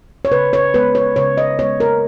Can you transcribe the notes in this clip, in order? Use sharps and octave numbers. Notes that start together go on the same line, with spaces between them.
C#5
C#3 B4
C#5
G#3 B3 B4
C#5
C#3 C#5
D#5
G#3 B3 C#5
A#4